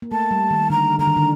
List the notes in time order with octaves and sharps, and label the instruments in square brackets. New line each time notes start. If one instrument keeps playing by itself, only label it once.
[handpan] A#3
[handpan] A3 [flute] A5
[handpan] G3
D#3
[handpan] D3 [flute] A#5
[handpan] D3 [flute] A#5
[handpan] D#3
D3